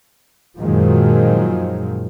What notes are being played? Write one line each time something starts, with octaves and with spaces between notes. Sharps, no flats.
F#2 A#2 D#3 F3 F#3 G#3